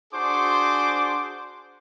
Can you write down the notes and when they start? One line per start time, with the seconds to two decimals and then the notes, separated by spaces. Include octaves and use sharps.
0.13 D4 F#4 G#4 C5 C6 D6